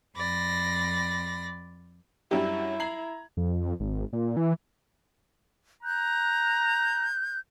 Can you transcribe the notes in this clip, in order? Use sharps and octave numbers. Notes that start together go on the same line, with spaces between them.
F2 D5 B5 A#6
F#2 F#3 G3 D4 E4 G4
A#5 G#6 C7 F#7
F2
G#1
A#2
E3
A#5 F#6 G6